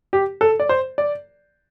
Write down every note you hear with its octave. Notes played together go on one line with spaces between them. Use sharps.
G4
A4
D5
C5
D5